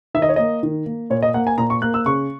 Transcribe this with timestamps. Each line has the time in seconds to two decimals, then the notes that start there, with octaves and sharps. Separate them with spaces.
0.14 D#3 E5
0.22 D#5
0.29 C#5
0.36 A#3 D#5
0.63 D#3
0.86 A#3
1.10 A#2 C#5
1.22 D#5
1.34 A#3 F#5
1.47 G#5
1.58 A#2 A#5
1.70 C#6
1.82 A#3 F#6
1.94 E6
2.06 C#3 C#6